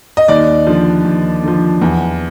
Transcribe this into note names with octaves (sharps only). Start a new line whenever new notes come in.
D#5
D#2 D5
D3 F3
D#2
D3 F3
E2